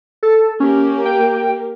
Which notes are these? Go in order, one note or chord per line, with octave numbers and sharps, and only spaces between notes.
A4
A#3 C#4 G4 A#4
G5